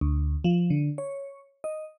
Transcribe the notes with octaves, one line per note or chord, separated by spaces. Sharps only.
D2
F3
D3
C#5
D#5